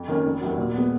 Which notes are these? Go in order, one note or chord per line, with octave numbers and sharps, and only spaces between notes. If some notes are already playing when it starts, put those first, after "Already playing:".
Already playing: F2
D#3 A#3 C#4
F1
D#2 D#3 F#3
A#2
G#3 B3